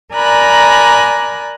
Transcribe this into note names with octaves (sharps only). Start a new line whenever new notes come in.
A#4 D5 G#5 A#5 B5 F#6